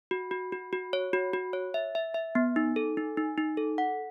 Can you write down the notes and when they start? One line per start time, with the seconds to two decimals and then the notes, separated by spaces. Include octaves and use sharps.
0.11 F#4
0.31 F#4
0.52 F#4
0.73 F#4
0.93 C#5
1.13 F#4
1.33 F#4
1.53 C#5
1.74 E5
1.95 E5
2.14 E5
2.35 B3
2.56 D#4
2.76 A4
2.97 D#4
3.17 D#4
3.38 D#4
3.57 A4
3.78 F#5